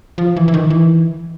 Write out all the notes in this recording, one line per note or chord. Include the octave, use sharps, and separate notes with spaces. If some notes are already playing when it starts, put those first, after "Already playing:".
F3
E3
E3
D#3
E3